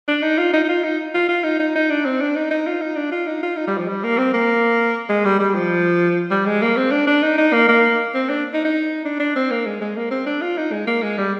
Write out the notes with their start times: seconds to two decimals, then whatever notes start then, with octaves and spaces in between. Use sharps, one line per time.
0.08 D4
0.22 D#4
0.38 F4
0.53 D#4
0.64 D#4
0.69 F4
0.84 D#4
1.14 F4
1.29 F4
1.44 D#4
1.59 D#4
1.75 D#4
1.91 D4
2.05 C4
2.21 D4
2.36 D#4
2.51 D#4
2.67 F4
2.81 D#4
2.96 D4
3.11 F4
3.27 D#4
3.43 F4
3.57 D#4
3.67 G3
3.78 F3
3.88 G3
4.03 A#3
4.18 C4
4.34 A#3
5.09 G#3
5.25 G3
5.40 G3
5.55 F3
6.31 G3
6.46 G#3
6.62 A#3
6.77 C4
6.92 D4
7.07 D4
7.23 D#4
7.38 D#4
7.53 A#3
7.68 A#3
8.14 C4
8.29 D4
8.54 D#4
8.65 D#4
9.05 D4
9.20 D4
9.36 C4
9.51 A#3
9.66 G#3
9.81 G#3
9.97 A#3
10.11 C4
10.26 D4
10.41 F4
10.58 D#4
10.72 G#3
10.87 A#3
11.02 G#3
11.18 G3